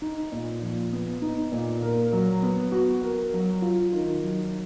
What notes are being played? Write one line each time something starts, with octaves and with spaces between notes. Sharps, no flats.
D#4
A#2
F3
B3
D#4
A#2
A#4
F#3
B3
F#4
A#4
F#3
F4
D#3
F#3